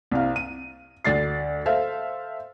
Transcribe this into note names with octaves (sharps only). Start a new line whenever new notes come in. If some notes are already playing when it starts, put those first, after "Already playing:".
C2 C3 F5
D#7
D2 D5 A6 C7
A4 C5 E5 F5